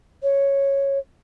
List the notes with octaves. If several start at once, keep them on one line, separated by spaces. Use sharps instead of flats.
C#5